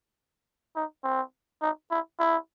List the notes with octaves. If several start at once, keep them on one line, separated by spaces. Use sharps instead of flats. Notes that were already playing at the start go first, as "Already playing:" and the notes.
D#4
C4
D#4
E4
E4